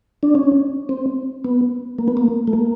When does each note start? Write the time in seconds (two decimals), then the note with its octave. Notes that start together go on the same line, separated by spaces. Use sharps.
0.23 D4
0.35 C#4
0.89 C4
1.45 B3
1.98 A#3
2.08 B3
2.17 A#3
2.47 A3
2.53 A#3